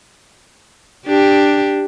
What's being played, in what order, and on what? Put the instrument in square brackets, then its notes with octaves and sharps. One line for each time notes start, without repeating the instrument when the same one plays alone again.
[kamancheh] D4 [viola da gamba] G4